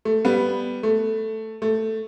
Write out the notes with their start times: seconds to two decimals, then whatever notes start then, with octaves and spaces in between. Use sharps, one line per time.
0.05 A3
0.25 G3 B3
0.83 A3
1.62 A3